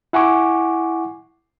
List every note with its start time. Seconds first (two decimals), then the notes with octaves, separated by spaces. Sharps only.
0.13 E4 F#5 G#5 C#6 D6